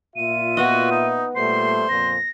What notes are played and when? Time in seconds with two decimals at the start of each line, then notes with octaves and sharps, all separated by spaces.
0.16 A#2 F4 E5 D#7
0.57 B3 F#4 D#5
0.91 D#4
1.36 A#2 G3 A3 C5 C7
1.89 F2 A#2 A#6